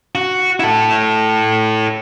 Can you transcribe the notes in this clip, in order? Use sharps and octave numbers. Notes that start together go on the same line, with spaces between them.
F#4
E4 A4